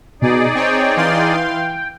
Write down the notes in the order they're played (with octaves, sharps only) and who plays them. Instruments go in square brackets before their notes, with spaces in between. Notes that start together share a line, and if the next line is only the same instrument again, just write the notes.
[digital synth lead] B2 [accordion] D#4 G#4 D5
[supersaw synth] C4 C#5 [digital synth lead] G5
[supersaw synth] E3 F5 C6